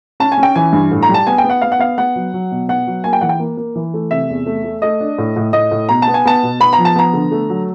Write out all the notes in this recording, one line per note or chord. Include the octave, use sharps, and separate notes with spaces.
C#4 A5
G#5
C#4
G5
E3 G#5
G2
A2
A#5
G3
A5
B3 G#5
G5
B3
F#5
B3 F5
F#5
B3 F5
B3 F#5
F#3
F#3
B2
B3 F#5
F#3
A#3 G#5
G5
E3 F#5
G5
A#3
A#3
E3
A3
C3 E5
E2
A3
A3
A3 D#5
D4
A2
A2
A2 D#5
A2
B2 A#5
A5
B3
G#5
B3 A5
B2
B3 B5
A#5
F3
A5
B3 A#5
D3
A3
F#3